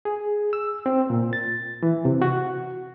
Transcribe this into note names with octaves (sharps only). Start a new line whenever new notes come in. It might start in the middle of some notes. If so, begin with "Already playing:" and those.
G#4
E6
C4
A#2
A6
E3
C3
F#4